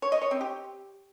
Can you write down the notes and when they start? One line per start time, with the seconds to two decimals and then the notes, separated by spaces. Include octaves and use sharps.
0.02 C#5
0.12 D#5
0.22 C#5
0.31 C4
0.41 G4